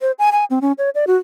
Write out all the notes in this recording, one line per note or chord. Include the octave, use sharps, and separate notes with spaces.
C5
G#5
G#5
C4
C#4
C#5
D5
F#4